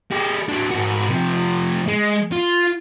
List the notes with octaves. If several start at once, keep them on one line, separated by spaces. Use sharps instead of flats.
G#3 G4
F#3 D4
G#2 F#4
C3 F3
G#3
F4